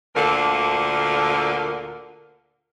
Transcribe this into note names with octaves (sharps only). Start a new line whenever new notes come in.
D2 A#2 D3 A#4 F5